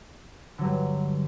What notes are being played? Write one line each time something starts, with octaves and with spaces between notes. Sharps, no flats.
G2 D3 F#3